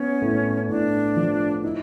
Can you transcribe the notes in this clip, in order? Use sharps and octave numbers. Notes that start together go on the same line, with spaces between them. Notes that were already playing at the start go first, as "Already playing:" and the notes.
Already playing: B3 C#4
A2
A2 D4
F3
D#4 E4